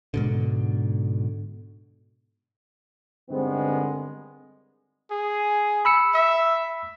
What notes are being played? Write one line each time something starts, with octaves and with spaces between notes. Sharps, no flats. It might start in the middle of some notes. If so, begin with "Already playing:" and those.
G#2 B2 D3
G2 D3 D#3 G#3 B3 C4
G#4
B5 E6 C#7
E5